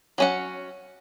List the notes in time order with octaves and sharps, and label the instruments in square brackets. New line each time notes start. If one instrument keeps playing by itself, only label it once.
[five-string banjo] F#3 C#4 F#5